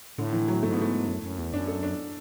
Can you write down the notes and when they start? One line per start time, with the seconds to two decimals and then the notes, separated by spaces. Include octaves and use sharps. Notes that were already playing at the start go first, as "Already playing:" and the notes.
0.18 A2 D3
0.33 E3
0.48 F#3
0.63 G#2 A3
0.72 B3
0.81 A3
1.07 F#2
1.23 F#2
1.38 E2
1.53 F#2 D4
1.68 A4
1.83 D4